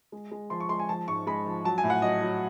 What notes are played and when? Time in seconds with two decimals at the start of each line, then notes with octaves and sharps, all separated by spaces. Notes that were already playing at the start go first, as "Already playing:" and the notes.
0.12 G#3
0.31 G#3
0.50 F3 C6
0.60 C#6
0.69 G#3 C6
0.79 G#5
0.89 F3 A5
1.08 G#2 C#6
1.27 G#3 B5
1.46 F3
1.64 F#3 A5
1.78 G#5
1.84 A2
1.90 F#5
2.02 F#3 D#5
2.22 F#3